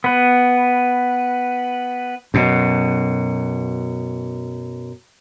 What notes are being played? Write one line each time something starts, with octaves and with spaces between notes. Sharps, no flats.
B3 B4
F#2 B2